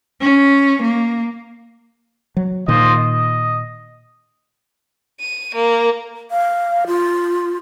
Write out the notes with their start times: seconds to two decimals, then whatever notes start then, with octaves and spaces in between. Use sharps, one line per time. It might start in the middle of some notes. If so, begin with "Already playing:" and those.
0.21 C#4
0.82 A#3
2.37 F#3
2.68 A#2 D#3 F4 C5 D#5
2.98 D#5
5.21 D#7
5.55 A#3
6.31 F5
6.87 F4